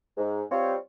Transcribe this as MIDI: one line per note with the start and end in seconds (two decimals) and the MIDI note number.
0.17 0.43 44
0.51 0.75 55
0.51 0.75 60
0.51 0.75 65
0.51 0.75 73